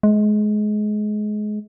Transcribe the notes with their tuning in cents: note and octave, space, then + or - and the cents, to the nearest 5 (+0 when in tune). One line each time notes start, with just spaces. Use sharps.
G#3 +25